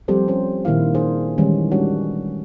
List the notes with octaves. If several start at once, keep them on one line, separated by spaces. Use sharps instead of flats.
F3 G3 C4 G4 A4 C5
C#4 C5
A#2 D#3 A#3 E4 F5
D4 G#4 C5
D#3 E3 G3 G#3 C#4
G3 G#3 C#4 D4 F#4 C#5